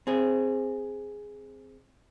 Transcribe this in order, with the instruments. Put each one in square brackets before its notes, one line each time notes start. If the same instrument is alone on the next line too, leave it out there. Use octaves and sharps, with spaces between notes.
[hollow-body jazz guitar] C4 G#4